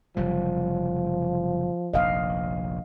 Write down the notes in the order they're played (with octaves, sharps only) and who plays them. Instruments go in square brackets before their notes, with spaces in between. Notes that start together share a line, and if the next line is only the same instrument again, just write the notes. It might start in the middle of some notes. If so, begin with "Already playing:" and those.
[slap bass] F#1 C3 G3 [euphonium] F3
[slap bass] F1 A#1 [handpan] D#5 F5